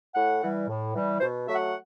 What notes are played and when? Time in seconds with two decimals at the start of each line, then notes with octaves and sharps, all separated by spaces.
0.15 A2 F#5
0.41 E3 G3
0.68 A2
0.94 E3 G3
1.20 B2 C5
1.47 F#3 A3 E5
1.55 F#5